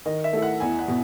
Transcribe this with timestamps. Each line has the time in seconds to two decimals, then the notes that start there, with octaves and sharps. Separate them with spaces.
0.06 D#3 D#5
0.24 E5
0.33 A3 E4 A4
0.42 F#5
0.60 E2 G#5
0.79 F#5
0.88 B2